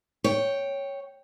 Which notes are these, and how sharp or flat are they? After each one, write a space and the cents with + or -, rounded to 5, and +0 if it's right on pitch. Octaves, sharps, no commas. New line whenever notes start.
C#5 +0 G5 +0